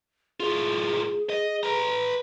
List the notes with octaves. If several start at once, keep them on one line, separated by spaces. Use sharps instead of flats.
A2 F4 G#4
D#5
B4 A#5